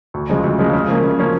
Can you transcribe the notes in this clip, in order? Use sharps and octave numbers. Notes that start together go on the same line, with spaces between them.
D2
C#3 F3 G#3
D2
C#3 F3 G#3
C#3
F3 A#3 C#4
C#3
F3 A#3 C#4